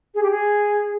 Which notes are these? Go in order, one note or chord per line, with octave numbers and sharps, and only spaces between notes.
G#4
G4
G#4